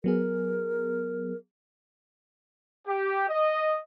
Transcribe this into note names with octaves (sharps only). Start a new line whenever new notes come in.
F#3 B3 G#4 A#4
G4
D#5